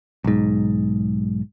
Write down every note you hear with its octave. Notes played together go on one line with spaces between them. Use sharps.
B1 G#2